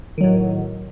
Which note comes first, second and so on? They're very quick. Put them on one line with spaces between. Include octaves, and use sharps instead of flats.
D#3 F#3 A2